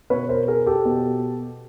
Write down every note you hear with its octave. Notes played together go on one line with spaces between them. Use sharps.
B2 B4 C#5
A#4 C5
G#4 A#4
G4 A4
B2